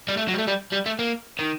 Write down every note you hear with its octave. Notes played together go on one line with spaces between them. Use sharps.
G3
A3
F#3
G3
A3
G3
G3
A3
A#3
D#3